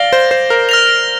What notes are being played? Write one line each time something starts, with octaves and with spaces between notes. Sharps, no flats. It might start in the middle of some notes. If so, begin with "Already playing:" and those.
Already playing: D5 F5 A#6 G7
C5
C5
A#4
F6 A#6 F7